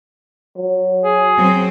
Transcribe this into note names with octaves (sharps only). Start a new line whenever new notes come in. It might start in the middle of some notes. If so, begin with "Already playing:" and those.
F#3
G#4
F#3 C4